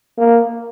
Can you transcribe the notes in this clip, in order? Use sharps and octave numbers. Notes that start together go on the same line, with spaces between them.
A#3